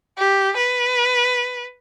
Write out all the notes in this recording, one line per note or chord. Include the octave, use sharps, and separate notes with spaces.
G4
B4